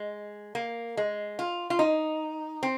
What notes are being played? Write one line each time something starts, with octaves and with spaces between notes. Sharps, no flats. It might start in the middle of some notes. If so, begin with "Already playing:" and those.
Already playing: G#3
A#3
G#3
F4
F4
D#4
C4